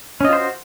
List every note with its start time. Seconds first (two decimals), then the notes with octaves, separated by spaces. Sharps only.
0.21 C#4
0.25 D#5
0.29 F4
0.33 C5
0.37 F#4